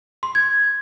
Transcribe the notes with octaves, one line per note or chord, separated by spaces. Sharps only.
C6
G#6